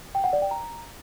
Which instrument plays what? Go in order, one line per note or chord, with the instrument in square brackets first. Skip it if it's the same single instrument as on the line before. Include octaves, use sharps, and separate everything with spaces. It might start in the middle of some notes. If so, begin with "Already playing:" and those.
[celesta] G5
F#5
D5
G5
A#5